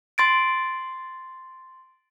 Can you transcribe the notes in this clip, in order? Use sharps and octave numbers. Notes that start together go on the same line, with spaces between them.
C6 A6 D7